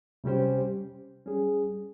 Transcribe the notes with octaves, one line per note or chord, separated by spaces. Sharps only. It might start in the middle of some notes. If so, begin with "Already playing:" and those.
C3 G3 C#4 G4 C5
G3 C#4 G#4